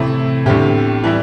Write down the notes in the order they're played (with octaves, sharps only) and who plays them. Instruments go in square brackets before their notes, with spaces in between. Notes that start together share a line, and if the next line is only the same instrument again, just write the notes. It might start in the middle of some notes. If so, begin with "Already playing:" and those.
Already playing: [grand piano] A2 A3 C4 E4 [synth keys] C3 E3
[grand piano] E2 D3 C4 G4 [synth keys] A2
[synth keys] A2
[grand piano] E3 G3 E4